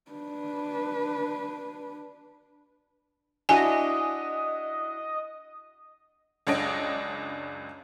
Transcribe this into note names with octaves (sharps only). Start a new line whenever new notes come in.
D4 B4
D4 E4 F#4 D#5 G#5
C#2 F#2 D4 C#5 D#5 D7